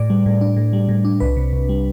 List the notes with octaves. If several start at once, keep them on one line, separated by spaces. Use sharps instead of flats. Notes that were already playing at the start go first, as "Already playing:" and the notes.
Already playing: A2 D5
G3
A2
D4
A2
G3
A2
D4
C2 B4
C3
C2
G3